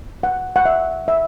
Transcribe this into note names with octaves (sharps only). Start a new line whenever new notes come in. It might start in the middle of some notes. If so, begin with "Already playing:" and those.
F#5
F#5
E5
E5